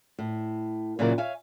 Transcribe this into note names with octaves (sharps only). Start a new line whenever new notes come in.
A2
A#2 C#3 E3 F#3 A#4 D5
C#5 E5 F5 G#5